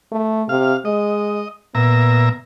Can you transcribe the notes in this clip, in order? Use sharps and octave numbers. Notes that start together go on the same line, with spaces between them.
A3
C3 F5
G#3 D#5
A#2 B3 E5 A#5